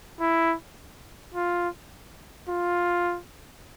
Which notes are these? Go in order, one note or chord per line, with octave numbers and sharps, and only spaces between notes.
E4
F4
F4